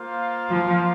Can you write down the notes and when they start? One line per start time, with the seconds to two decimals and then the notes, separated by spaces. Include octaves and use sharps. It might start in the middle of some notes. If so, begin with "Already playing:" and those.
Already playing: A#3 F4 C5 F5
0.50 F3